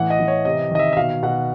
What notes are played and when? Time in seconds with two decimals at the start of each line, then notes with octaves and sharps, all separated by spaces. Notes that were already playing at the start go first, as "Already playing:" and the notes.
Already playing: A2 E3 F#5
0.10 D#5
0.20 E3
0.28 C#5
0.45 C3 D#5
0.71 D#3 D#5
0.79 E5
0.93 E5
0.97 B2 F5
1.23 B2 F#5